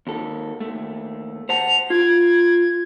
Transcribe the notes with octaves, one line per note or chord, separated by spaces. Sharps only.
D#2 A4
D#2 A3
C5 F#5 A5 F7
F4 G#6